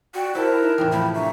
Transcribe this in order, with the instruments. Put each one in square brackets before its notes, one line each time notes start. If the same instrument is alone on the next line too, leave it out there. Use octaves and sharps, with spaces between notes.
[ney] F#4 [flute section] D5 F#5 G5
[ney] E4 [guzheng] A4 [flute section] A#4 A5 F#6 [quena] C5
[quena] D#4
[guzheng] E2 A2 C3 [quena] G5
[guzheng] F3 A3 [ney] B5
[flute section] D4 C#6 [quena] E5 [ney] A#5